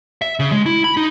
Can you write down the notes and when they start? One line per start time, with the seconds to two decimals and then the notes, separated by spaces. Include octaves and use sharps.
0.22 E5
0.39 C#3
0.52 G#3
0.66 E4
0.84 B5
0.97 D#4